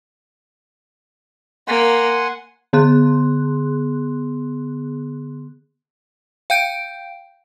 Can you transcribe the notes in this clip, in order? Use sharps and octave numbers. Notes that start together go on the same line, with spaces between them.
A#3 F#5 G#5 C6
D3 B3 G#4 C6 F#6
F5 G5 G6 D7